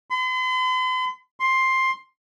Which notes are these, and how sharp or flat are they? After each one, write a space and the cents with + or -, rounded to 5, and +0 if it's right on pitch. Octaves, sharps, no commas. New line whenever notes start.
C6 -45
C6 +10